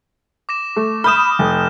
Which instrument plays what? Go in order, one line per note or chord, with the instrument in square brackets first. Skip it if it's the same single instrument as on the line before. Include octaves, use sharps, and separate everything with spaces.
[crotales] D6 A#6 E7
[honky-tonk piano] A3
[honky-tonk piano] B5 D#6 [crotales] F6 G6 E7
[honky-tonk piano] F1